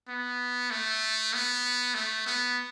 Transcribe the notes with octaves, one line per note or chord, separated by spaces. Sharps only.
B3
A3
B3
A3
B3